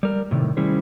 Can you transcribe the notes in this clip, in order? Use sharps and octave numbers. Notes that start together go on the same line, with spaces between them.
G3 A#4
A2 C3 D#3
D#3 G3 C#4 E4 G#4 C5